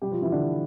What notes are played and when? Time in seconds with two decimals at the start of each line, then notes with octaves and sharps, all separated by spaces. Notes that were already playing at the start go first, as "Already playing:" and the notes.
0.01 B2 G3 G4
0.12 F3 F4
0.22 E3 E4
0.32 D3 D4